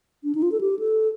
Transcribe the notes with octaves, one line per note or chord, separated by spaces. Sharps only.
D4
D#4
F4
A4
G4
A4